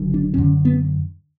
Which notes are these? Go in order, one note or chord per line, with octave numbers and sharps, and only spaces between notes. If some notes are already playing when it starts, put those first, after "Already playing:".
Already playing: F#1 F#2 D3
D4
F#1 F#2 D3 C#4
B3